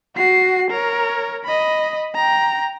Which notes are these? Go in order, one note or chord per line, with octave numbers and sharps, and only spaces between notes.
F#4 C7
A#4 C#5
D#5 B5
G5 A#5